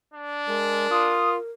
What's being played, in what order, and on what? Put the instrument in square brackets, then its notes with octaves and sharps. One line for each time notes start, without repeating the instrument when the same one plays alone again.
[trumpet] D4
[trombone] G#3 [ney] A#4
[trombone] F4 [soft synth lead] D#6